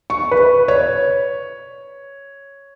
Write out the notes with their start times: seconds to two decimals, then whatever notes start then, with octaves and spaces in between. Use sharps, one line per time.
0.10 C#6
0.31 B4
0.68 C#5